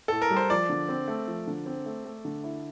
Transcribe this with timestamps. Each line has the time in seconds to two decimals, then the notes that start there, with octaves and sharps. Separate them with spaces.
0.08 A2 A4
0.22 A#4
0.30 G3
0.37 C5
0.50 F3 D5
0.69 D3
0.89 C4
1.08 A3
1.28 F3
1.47 D3
1.66 C4
1.86 A3
2.05 A3
2.25 D3
2.44 E4